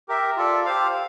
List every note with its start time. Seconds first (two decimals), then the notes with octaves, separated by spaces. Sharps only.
0.08 G4 A#4 E5
0.37 F4 A4 D5
0.65 G4 C5 F5